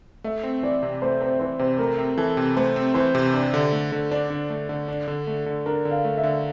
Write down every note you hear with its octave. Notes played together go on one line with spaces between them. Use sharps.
A3 E5
C4
E3 D5
C3
A3 C5
C4 C5
E3 C5
C3 C5
A3 A#4
C4
E3 A4
C3
A3 C5
C4
E3 C5
C3
D4 C5
D3
A3
D3
D4 D5
D3
A3
D3
D4
D3
A3
D3
D4 A#4
D3
F5
A3
E5
D3